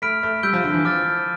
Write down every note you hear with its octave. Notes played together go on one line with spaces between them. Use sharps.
A3 B5 F6 B6 D7
A3
G3 E6 G6 D7 G7
F3
D3
E3
F3 D6 F6 A6